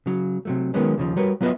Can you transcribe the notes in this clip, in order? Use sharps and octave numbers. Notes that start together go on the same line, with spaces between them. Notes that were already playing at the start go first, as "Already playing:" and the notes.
C#3 F#3
C3 F#3 A3
D#3 F#3 G#3 A#3 B3 C#4
D#2 C#3 F3
G3 F#4 A#4 B4 C#5
F#3 B3 F4 B4 D#5 E5